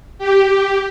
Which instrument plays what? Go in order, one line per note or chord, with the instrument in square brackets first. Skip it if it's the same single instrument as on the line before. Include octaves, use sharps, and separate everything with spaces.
[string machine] G4